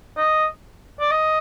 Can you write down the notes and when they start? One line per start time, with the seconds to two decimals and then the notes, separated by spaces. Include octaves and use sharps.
0.17 D#5
1.00 D5
1.11 D#5